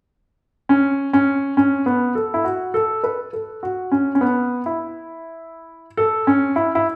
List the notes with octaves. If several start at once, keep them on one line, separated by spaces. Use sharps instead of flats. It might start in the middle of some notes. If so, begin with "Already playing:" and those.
C#4
C#4
C#4
B3
A4
E4
F#4
A4
B4
A4
F#4
C#4
C#4
B3
E4
A4
C#4
E4
E4